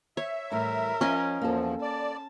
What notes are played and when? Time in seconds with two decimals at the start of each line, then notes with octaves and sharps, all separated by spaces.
0.17 C#5 E5
0.52 A2 E3 G3 A#4
1.01 F3 C#4 D#5 G#5
1.41 E2 F3 A#3 A4
1.82 D5 A5